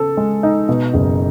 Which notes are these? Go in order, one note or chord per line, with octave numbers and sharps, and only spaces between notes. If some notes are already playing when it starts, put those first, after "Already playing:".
Already playing: C#3 B3 A4
G#3
D#4
B2
F#1